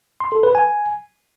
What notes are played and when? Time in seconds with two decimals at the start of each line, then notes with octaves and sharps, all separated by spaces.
0.20 C6
0.32 A4
0.43 B4
0.55 G#5